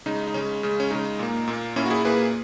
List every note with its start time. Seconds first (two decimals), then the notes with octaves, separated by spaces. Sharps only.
0.06 C#3 G#3 D#4
0.27 D#4
0.34 C#3 G#3 C#4
0.63 C#3 G#3
0.80 C#4
0.91 C#3 G#3 D#4
1.19 A#2 A#3
1.48 A#2 A#3
1.76 A#2 A#3 C#4 E4
1.86 F#4
1.90 E4 G#4
2.04 A#2 A#3 G#4 B4